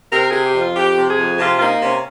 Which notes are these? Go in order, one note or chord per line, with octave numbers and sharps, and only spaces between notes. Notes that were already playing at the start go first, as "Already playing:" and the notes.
C3 A#4
C3 G#4
G4
F2
F4
F2 G4
C3
G#4
F2
C3 F4
F4
A#3 D#4
C3 C#4